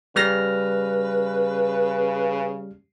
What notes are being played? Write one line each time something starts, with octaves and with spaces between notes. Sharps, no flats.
C#3 G3 B4 F6 A#6